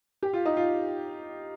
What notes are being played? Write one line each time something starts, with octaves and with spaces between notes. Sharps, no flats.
G4
F4
D#4
F4